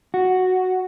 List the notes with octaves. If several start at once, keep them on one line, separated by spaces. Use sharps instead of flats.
F#4